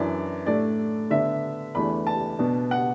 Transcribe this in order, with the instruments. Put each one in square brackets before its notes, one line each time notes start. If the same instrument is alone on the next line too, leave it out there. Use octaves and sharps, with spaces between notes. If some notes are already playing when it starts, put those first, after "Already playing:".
Already playing: [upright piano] F#2 E3 D4 D5
A2 A3 D4 D5
D3 B3 D4 E5
E2 E3 A3 D4 B5
A5
B2 B3 D4
F#5